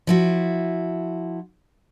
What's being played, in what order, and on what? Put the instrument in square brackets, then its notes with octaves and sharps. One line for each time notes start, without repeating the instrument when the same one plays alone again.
[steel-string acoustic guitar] F3 E4 F#4